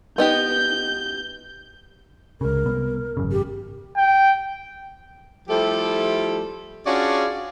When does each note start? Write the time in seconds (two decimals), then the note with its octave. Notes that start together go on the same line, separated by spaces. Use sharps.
0.18 B3 D#4 G4 G6
2.41 C#2 C#3 A#4
2.66 C2 B3
3.17 G#1 F#2 C#3
3.32 G4
3.97 G5
5.49 F3 G3 A3 E4 G4 A4
6.86 C#4 D4 F4 F#4 G#4 D5